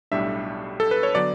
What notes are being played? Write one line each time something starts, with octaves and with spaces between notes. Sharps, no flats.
B1 A2 G3 D4 E5
A4
B4
C#5
D3 F#3 B3 D5